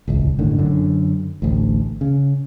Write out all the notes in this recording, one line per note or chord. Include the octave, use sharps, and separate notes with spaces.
D#1 G#1 C#2
G1 A2 D3 D#3
F#2 D3
A1 D2
C#3